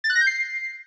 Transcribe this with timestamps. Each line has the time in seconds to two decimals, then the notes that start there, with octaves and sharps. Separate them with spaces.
0.04 A6
0.10 F#6
0.15 A#6
0.21 G6
0.27 C7